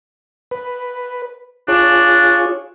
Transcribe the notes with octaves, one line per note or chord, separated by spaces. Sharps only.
B4
D4 F4 G#4 C#5